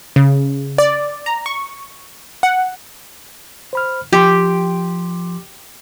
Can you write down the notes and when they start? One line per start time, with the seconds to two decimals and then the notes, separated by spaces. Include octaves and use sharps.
0.16 C#3
0.78 D5
1.26 A#5
1.46 C#6
2.43 F#5
3.73 C5 B5 F6
4.13 F3 G4 C6